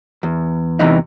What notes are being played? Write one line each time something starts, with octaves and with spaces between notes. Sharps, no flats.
E2
E2 C3 E3 D#4